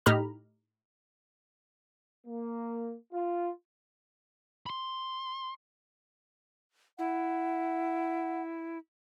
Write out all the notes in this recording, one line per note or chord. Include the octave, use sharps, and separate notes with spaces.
A2 D#4 G4 A#5 B5 F6
A#3
F4
B5 C6
E4 F#5